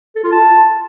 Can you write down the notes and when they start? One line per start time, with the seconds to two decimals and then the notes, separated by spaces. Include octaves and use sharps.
0.16 A4
0.24 F4
0.32 A5